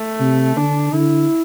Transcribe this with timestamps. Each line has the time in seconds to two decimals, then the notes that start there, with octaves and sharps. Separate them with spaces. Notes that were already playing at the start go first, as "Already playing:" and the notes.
Already playing: A3
0.20 C3
0.57 D3 D4
0.93 D3 E4